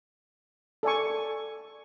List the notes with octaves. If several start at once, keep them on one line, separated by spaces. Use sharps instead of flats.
A4 D5 G#5 C#6